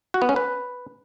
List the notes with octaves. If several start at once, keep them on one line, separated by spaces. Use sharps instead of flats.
F#4
B3
C#4
B4